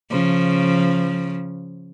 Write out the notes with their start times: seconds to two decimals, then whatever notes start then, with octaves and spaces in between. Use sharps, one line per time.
0.11 C#3 F3